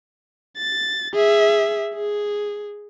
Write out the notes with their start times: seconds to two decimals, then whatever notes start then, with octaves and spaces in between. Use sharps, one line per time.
0.58 A6
1.14 G#4 E5
1.94 G#4